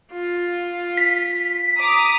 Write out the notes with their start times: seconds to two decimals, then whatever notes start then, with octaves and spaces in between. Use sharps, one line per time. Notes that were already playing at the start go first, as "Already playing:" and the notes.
0.13 F4
0.97 B6
1.78 A#5 D6 D#6